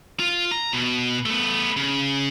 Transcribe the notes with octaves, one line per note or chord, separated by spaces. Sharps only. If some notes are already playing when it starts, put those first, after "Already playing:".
F4
A#5
B2
A3 B3
C#3